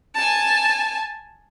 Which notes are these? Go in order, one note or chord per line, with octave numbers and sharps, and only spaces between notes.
G#5 A5